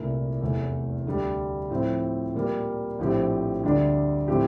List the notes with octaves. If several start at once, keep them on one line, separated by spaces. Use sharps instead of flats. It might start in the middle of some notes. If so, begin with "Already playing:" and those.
Already playing: C2 A#2 A3 E4 A#4
F1 E2 E3 A3
D2 D3 G3
A2 F3 C4 F4
A#2 G3 A#3
A#1 A2 F3 C4 G4
D2 D3 G3 D4
A2 F3 C4 G4